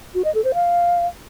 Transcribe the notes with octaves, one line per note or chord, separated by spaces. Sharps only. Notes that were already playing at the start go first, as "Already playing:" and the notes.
F#4
D#5
A4
C5
F5